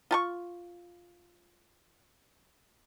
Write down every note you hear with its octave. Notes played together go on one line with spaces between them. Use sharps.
F4 A5 C#6